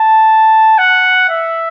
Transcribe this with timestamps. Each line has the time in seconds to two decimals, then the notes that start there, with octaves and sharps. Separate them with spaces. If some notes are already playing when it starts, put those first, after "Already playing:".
Already playing: A5
0.78 F#5
1.30 E5